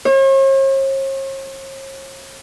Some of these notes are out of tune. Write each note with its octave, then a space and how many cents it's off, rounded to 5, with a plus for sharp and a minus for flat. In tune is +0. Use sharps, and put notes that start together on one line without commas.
C#5 -45